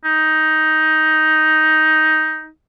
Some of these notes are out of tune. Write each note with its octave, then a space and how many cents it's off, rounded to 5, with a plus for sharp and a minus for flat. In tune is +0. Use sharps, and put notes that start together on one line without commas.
D#4 +10